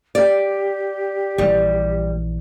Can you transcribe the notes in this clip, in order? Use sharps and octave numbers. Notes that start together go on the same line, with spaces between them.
G4 D5
A#1 E3 G3